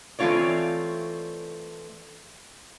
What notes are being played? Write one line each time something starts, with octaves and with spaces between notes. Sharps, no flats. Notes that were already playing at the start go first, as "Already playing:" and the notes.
E3 A3 C4 F4 C#5 D5